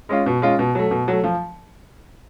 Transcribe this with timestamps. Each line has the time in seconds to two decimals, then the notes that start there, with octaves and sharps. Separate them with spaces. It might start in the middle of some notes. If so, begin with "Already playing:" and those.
0.09 G#3 C#4 F4
0.26 B2
0.42 G#3 C#4 F4
0.59 B2
0.75 F#3 A3
0.91 B2
1.08 F#3 A3
1.24 F3